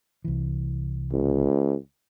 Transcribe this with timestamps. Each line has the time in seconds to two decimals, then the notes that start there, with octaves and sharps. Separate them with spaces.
0.24 C2 E3
1.12 C#2